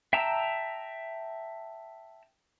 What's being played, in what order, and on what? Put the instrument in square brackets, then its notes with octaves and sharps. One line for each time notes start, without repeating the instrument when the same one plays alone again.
[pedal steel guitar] E5 G5 A5 A#5 E6